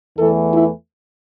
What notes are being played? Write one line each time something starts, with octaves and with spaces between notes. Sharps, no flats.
E2 E3 A3 A4
E4